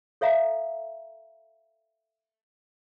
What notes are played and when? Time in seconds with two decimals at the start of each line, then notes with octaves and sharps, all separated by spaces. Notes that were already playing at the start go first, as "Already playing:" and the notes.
0.21 A4 C#5 E5 F5 A#5